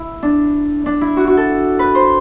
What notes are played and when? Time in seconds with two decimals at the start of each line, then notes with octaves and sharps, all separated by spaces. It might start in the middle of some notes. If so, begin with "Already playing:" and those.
Already playing: E4
0.23 D4
0.86 D4
1.01 E4
1.17 F#4
1.27 F#4
1.37 A4
1.79 B4
1.95 C5